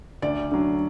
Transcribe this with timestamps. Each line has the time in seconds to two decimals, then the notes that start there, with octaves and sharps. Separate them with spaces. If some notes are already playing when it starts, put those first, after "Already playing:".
0.22 D2 D5
0.51 D3 F#3